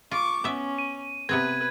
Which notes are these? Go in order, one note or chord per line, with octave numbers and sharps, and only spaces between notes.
F4 C#6 D6
B3 C#4 E5
D#7
C3 B3 C4 B4 G#6